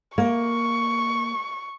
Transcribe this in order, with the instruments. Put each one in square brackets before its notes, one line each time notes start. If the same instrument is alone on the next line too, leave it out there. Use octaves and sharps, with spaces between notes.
[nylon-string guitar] A#3 [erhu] C#6